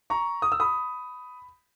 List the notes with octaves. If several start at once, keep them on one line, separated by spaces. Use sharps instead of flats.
A#5 C#6
D#6
E6
B5 D#6